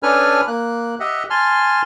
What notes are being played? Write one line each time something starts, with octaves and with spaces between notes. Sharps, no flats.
C#4 D4 A4 B4 G#5 F6
A#3 F#6
G4 D#5 E5 F#5
G#5 A5 C6 F6